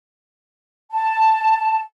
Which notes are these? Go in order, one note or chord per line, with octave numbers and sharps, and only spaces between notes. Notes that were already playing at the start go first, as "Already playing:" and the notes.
A5